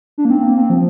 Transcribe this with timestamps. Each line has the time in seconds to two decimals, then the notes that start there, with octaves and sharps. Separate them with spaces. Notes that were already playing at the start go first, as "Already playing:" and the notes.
0.18 D4
0.25 A#3
0.31 C4
0.43 A#3
0.57 C4
0.70 F3